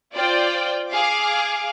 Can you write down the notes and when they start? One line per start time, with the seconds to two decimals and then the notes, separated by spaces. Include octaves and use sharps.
0.15 F4 C5 D5 G5
0.90 G#4 F5 D6